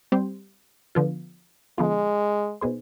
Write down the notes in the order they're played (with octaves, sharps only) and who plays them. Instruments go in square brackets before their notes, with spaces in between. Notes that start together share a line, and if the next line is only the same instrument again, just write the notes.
[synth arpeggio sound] G3 C4 G4 C5
D3 F3 B3 F4
[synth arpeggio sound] D3 F3 B3 F4 [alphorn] G#3
[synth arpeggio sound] B2 B3 D#4 G#4 C5